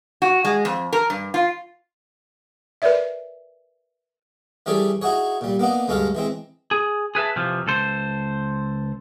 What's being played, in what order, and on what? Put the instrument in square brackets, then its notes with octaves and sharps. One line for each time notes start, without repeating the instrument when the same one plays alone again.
[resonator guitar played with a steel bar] F#4
G#3
F2
A#4
G2
F4
[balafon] A#4 B4 C#5 D5 E5
[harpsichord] E3 G3 C#4 G#4 A4 D5
D#4 E4 F#4 G#4 C#5
A#2 G3
A#3 B3 D4 D#4
D2 G2 G#3 C#4 A4 F5
E3 G#3 C4
[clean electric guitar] G#4
G#4 B4 E5 A5
F2 C3 E3 F3
C#2 A4 C5